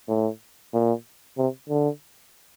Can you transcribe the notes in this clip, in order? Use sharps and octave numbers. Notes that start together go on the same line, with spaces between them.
A2
A#2
C3
D3